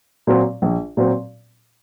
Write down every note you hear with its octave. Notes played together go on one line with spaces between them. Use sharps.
A#2 F#3 C4
A#1
A#2 F#3 C4